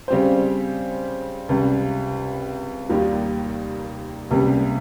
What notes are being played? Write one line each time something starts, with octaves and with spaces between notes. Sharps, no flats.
C#3 G3 C4 G4 C5
C#2 C3 G3
D#2 D#3 G3 A#3
C#2 C3 G3 A#3